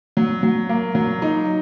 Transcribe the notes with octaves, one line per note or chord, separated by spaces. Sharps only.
F#3
F#3
A#3
F#3
D#4